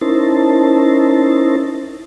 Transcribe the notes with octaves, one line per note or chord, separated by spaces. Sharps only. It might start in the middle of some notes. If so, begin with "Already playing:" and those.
C#4 D#4 E4 A#4 C5 A5